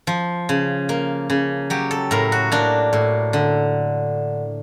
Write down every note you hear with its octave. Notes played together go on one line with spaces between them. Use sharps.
F3
C#3
A#3
C#3
F#3 G4
A4
A2 A#4
F#4
A#3 D4
A2
D3